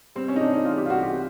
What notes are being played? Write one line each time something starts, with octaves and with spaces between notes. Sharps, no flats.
G3 C4
C#4
D#4
C3 D4
D#4
E3 F4
G4
F4
C2 F#4
G4